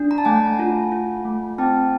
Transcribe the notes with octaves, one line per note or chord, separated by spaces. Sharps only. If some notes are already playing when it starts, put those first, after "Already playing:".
Already playing: D4
A#5
A5
A3 F#5 G#5
F4
F4
A3
C4 G5 A5